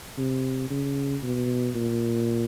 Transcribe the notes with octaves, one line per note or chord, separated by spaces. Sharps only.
C3
C#3
B2
A#2